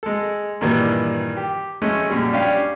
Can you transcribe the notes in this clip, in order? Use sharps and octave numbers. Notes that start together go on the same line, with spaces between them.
G#3 A4
G2 A#2 D#3 E3 G3
G4
G#3 A3 C#4
F#2 A#2 G3
C#4 D4 G4 F5